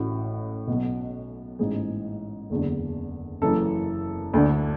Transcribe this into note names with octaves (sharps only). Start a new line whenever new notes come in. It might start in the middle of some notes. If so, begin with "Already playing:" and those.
Already playing: A1 A2 E3 F#4
B1 B2
A1 G#2 E3 G#4
F#1 E2 D3
F#1 F#2 E3 A4
D2 D3